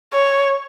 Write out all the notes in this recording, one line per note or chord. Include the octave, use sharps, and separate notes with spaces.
C#5